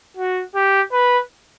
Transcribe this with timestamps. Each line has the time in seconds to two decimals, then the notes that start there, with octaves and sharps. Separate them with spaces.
0.17 F#4
0.55 G4
0.93 B4